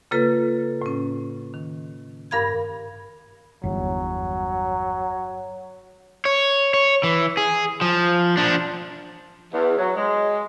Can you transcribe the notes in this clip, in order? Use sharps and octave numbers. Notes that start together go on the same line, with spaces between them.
C#3 A#3 F4 A4 B4
A2 C#4
D#3
G2 A#4 F5 B5 G#6
G1 E2 F#3
C#5
C#5
E3
G#4
F3
F3 D4
E2
F#3
G#3